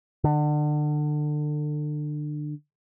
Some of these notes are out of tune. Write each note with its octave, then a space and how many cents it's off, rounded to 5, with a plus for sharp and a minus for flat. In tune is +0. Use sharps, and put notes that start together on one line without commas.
D3 +30